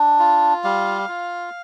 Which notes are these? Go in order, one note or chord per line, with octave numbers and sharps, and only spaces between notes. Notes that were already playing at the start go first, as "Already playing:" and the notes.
Already playing: D4
F4
G3 F5
F4